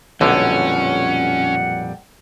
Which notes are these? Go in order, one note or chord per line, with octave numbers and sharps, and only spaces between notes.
B1 F2 A#2 D3 G3 C#4 F#5